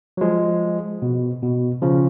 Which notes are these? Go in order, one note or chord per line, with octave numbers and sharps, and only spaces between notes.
F#3
F3 G#3
B2
B2
C#3 F3